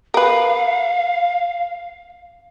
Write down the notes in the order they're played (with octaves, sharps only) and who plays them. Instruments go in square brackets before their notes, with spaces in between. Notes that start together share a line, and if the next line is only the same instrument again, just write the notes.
[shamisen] A#4 B4 [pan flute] F5